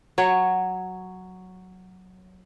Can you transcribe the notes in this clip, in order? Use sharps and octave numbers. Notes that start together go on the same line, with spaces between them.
F#3 C#5